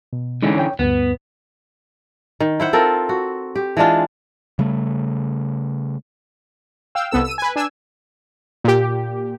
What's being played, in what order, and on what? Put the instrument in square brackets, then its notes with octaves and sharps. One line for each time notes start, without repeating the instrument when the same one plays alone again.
[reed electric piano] B2
[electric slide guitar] D3 E3 C#4 [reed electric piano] G#3 D#4
[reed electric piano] C#5 G5
[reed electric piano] D2 G2 [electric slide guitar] B3
[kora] D#3
E4 C5 F#5
C4 F4 A4 A#4
F#4
G4
E3 G#3 D4 F4
[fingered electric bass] C#3 G3 A3
[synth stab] F5 G5 E6
C2 B3 A4 E6
E6 D#7
B4 G#5
D4 G#5 E6
A#2 G4